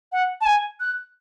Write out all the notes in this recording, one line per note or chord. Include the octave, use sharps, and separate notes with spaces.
F#5
A5
G#5
F#6